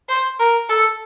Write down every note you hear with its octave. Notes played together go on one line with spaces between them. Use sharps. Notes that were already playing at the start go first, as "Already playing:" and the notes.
C5
A#4
A4